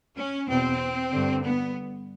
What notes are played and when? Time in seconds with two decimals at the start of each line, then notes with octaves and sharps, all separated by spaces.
0.15 C#4
0.47 E2 B2 C4
1.12 G2 D3
1.43 B3